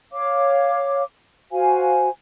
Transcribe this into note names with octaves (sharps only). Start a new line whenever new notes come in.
C#5 F5 D6
F#4 C5 F5 G#5